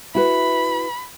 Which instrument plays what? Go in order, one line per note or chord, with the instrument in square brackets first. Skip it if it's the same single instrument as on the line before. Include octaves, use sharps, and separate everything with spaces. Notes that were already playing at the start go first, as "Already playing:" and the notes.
[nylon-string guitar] E4 F#4 B4 [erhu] B5